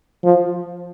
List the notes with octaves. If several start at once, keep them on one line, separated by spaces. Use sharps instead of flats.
F3